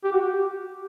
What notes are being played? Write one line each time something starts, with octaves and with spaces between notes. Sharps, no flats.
G4
F#4
G4